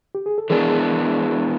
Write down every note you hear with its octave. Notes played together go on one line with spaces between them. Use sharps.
G4
G#4
A4
E3 G#3 B3 D4 G#4 A#4